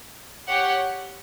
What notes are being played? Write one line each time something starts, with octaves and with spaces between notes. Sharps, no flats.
G4 C#5 F#5